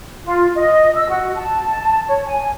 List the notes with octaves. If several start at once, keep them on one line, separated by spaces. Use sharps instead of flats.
F4
D#5
E6
F#4
A5
C#5
G#5